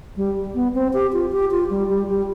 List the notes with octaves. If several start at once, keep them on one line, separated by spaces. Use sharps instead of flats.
G3
B3
C4
G4
F4
G4
F4
G3
G3
G3